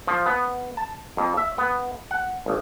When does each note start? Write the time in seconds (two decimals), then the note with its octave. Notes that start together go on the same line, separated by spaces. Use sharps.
0.07 F3
0.26 B3
0.77 A5
1.17 F2
1.37 E5
1.58 B3
2.11 F#5
2.46 G#1